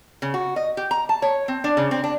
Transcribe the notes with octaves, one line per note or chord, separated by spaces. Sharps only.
C#3
F#4
D#5
G4
A#5
A5
C#5
C4
D4
C#3
C4
D4